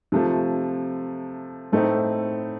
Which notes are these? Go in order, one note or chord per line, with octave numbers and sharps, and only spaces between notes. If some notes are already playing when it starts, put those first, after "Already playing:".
C3 F3 A3
A2 A3 C4 D#4